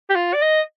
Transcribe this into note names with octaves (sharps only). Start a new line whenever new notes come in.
G4
F4
D5
D#5